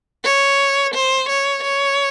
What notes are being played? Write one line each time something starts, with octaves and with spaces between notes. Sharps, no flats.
C#5
C5
C#5
C#5